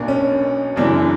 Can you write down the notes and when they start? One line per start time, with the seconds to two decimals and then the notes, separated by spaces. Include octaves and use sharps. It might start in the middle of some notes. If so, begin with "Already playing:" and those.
Already playing: B1 B2 A#3 D4 A#4
0.08 C#4
0.76 F#1 F#2 E3 D4